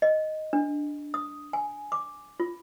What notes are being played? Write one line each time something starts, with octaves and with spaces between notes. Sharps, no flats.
D#5
D4
D#6
G#5
D6
F4